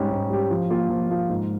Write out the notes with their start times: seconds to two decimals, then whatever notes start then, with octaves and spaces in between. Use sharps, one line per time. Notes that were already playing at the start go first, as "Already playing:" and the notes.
Already playing: G#2 G3 C#4 G4
0.11 G#2
0.30 G3 C#4 G4
0.51 F3
0.70 A#3 F4
0.89 F3
1.10 A#3 F4
1.29 G#2